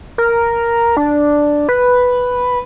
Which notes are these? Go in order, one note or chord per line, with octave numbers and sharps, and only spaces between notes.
A#4
D4
B4